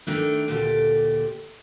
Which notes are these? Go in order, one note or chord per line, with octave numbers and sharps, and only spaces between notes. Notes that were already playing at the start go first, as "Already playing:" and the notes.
D#3 A3 D4
D2 A#2 G4 A4